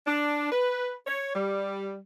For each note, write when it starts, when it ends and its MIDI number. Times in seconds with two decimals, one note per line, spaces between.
0.07 0.50 62
0.52 0.94 71
1.06 1.34 73
1.35 1.98 55